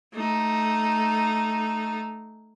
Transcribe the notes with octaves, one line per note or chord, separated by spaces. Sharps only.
A3 D#4